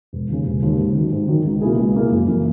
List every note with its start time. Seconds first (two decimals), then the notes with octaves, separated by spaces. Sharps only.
0.13 E1
0.29 D#2 C#3
0.45 E1
0.62 D#2 C#3
0.78 G#2
0.95 D#3 F#3
1.12 G#2
1.28 D#3 F#3
1.45 C#2
1.61 B2 A#3 E4 G#4
1.78 C#2
1.94 B2 A#3 E4 G#4
2.11 F#1
2.28 F#2 E3 A#3